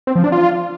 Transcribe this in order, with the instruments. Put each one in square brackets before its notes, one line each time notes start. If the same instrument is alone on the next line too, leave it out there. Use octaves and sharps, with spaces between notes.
[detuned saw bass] C4
F3
D4
F4